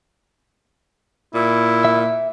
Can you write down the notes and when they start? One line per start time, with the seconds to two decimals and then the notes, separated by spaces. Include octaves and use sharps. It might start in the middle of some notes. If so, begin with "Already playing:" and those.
1.35 A#2 E4
1.85 E5